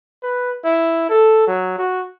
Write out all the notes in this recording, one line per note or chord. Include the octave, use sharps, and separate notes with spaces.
B4
E4
A4
F#3
F#4